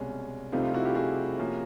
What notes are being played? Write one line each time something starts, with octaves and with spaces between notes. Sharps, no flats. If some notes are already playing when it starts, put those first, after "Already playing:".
Already playing: C2 B2 G#3 C#4
C2 C3 F3 A3 C4 D#4 F4
D#4 F4
E4 F#4
F4 G4
F#4 G#4
C3 F3 A#3 C#4